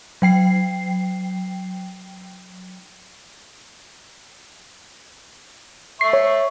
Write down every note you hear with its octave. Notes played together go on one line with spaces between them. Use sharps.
F#3 G5 C7
E5 C#6 C7
C#5